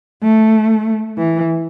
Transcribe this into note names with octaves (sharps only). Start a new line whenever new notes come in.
A3
E3